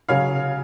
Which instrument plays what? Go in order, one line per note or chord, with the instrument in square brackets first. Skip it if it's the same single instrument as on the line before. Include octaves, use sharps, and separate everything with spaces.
[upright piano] C#3 F#3 C#5 F5